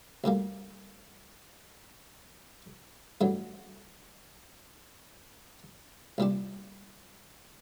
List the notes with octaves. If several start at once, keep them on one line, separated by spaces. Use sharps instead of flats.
D2 D3 G3 A#3
A1 G2 D3 F#3
C2 A#2 G3 D4